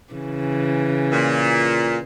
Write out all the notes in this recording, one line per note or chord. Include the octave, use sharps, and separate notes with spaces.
C#3 E3
A#2